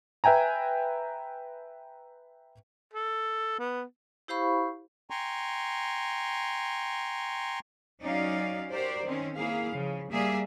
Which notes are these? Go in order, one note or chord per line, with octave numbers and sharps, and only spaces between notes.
B4 E5 G5 G#5 A#5
A4
B3
E4 G4 C5 F5 B5 C#6
G5 G#5 A#5 C6 C#6
F#3 C#4 D#4 D5 F5
F#4 G4 A#4 C5 D5
D#3 C4 C#4
A#3 E4 G#4 F5
C#3 F3
G3 A#3 G#4 D5 E5